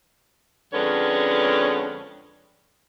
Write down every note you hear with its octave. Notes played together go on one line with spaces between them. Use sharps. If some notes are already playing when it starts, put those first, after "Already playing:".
F2 D3 G#3 C#4 B4 C#5